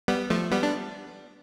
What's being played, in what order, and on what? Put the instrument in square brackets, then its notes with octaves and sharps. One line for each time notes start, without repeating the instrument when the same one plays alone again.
[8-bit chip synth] G3 B3
F3 A3
G3 B3
D4